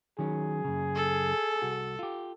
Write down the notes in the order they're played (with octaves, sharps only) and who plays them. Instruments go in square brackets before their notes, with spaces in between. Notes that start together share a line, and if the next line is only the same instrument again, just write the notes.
[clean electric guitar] D#3 F#3 C#4 [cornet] G#4
[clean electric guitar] F#2 C#3
[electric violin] A4
[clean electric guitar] C2 F#4
F4 G4